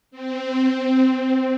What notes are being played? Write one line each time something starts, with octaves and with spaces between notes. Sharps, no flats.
C4